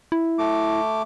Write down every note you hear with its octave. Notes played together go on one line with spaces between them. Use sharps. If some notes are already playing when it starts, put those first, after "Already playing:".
E4
A3 D6